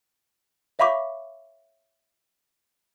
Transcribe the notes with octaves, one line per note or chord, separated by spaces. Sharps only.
C#5 E5 F5 B5 C#6 D6